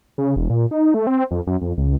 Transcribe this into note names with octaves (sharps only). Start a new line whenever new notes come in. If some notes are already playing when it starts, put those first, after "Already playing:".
C#3
E1
A#2
D#4
A3
C4
F2
F#2
F2
C#2